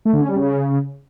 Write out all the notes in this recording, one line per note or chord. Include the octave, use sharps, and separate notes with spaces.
A3
D3
C#4
G3
C#3